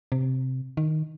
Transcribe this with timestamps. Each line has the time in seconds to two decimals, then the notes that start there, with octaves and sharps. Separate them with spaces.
0.12 C3
0.77 D#3